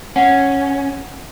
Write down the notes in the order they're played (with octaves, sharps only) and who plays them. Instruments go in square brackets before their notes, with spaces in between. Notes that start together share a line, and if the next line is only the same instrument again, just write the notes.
[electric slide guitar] C#4 [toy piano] F#5